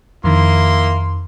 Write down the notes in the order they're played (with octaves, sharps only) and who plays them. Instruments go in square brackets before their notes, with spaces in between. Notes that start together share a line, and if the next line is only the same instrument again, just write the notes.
[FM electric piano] F2 D#3 [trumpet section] A#3 E4 C6